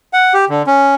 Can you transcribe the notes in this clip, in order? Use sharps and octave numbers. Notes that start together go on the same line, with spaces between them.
F#5
G4
D3
C#4